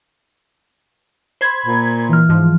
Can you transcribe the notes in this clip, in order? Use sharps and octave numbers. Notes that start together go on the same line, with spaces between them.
C5 B5 G#6
A#2
E3 F6
G#2 F3